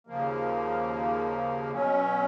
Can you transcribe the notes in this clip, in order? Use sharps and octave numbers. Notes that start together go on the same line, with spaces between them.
D#2 C#3 F3 A#3
B2 F#3 C#4